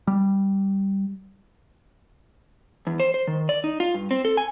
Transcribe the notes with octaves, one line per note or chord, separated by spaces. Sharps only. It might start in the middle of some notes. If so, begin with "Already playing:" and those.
G3
E2
C5
C5
D#3
D5
D#4
F4
G2
C4
A4
G#5